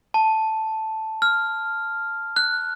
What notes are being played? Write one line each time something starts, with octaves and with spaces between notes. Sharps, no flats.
A5
F6
F#6